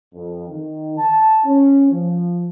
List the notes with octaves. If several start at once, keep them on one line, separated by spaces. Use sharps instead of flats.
F2
D#3
A5
C#4
F3